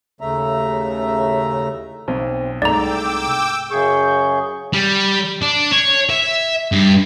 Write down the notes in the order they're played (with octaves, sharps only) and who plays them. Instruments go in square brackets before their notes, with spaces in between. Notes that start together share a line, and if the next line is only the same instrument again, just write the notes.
[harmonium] D#2 A2 C#3 A3 E5 A#5
[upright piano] B1 [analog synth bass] C4
[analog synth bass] C2 [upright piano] G#2 A3 [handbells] D5 A#5 [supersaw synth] G5 D6 E6
[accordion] F#2 C#3 G#4 C#6 G6
[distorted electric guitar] G3
D4
C#5
E5
G2